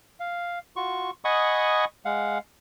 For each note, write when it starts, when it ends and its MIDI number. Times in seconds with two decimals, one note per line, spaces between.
0.20 0.59 77
0.76 1.11 65
0.76 1.11 66
0.76 1.11 85
1.25 1.85 75
1.25 1.85 78
1.25 1.85 80
1.25 1.85 83
1.25 1.85 85
1.25 1.85 87
2.05 2.38 56
2.05 2.38 77
2.05 2.38 78